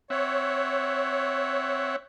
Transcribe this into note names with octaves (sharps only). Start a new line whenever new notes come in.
C4 C#5 E5 F#5